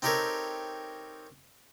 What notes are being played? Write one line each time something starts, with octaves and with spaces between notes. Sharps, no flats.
C4 D#4 G4 A4 A#4 C#5